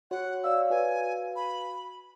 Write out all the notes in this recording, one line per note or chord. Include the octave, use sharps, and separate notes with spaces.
F#4 C#5 F#5
C#5 D5 F5 E6
F#4 B4 F5 G#5
B5